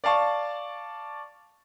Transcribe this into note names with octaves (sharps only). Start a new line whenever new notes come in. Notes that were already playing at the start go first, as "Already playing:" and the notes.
D5 F5 A5 C#6